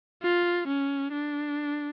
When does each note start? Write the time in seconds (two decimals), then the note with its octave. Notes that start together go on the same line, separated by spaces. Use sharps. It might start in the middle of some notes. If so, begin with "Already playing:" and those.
0.23 F4
0.67 C#4
1.12 D4